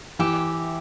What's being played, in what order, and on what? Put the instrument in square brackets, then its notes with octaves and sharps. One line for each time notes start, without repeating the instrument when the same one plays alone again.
[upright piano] E3 [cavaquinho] G4 E5 G5